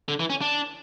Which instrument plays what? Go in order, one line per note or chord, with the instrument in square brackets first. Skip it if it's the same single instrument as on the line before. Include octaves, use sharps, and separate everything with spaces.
[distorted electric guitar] D3
E3
C#4
D4